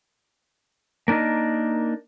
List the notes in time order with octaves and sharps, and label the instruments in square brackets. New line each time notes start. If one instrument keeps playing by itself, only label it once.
[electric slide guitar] A#3 D4 D#4 A#4 D#5